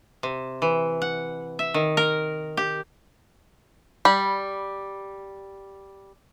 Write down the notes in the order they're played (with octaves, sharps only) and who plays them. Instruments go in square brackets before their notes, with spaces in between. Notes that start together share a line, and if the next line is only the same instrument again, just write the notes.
[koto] C3
E3
F#5
E5
D#3
A#4
G4
[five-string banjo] G3 [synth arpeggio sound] B5